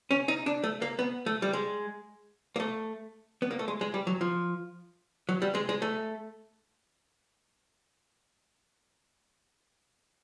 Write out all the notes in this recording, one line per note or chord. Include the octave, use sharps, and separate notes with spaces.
C#4
D#4
D4
A3
A#3
B3
A3
G3
G#3
A#3
A3
B3
A#3
A3
G#3
G#3
G3
F#3
F3
F#3
G3
G#3
G#3
A3